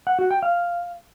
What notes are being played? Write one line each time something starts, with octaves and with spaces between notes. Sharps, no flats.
F#5
F#4
G5
F5